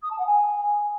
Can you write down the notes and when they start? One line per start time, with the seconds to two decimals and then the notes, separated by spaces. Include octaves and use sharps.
0.02 D#6
0.10 A5
0.18 F#5
0.26 G#5